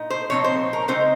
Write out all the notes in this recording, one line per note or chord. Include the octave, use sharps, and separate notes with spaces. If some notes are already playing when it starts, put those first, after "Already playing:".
Already playing: A#2 D#4
C5
A#2 F3 C4 D#4 C#5
C5
A#4
C#3 G#3 C4 D#4 C5